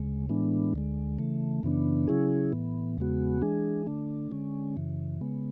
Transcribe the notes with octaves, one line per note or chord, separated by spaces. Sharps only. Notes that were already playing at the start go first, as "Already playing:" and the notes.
Already playing: D2 C#3 G#3
A2 E3 G#3 B3 D4
D2 D3 G#3
C#3 E3 A3
F#2 C#3 E3 B3 D4
C#3 F#3 C#4 E4 G#4
A2 E3 B3
E2 C#3 G#3 B3 F#4
E3 G#3 D4 G#4
D3 A3 D4
D3 G#3 C#4
F#2 C#3 E3
C#3 G#3 B3